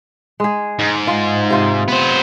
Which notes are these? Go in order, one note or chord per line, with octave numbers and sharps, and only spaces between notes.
G#3 G#4
G#2
F4
C3 F4
B3 C5